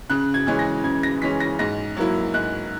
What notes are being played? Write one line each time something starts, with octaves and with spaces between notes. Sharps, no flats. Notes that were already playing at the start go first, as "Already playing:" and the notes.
C#3 F#6
G#6
E3 G#3 C#4
A#6
C#3 G#6
A#6
E3 G#3 C#4 B6
A#6
G#2 A#6
F#3 A#3 E4
G#2 F#6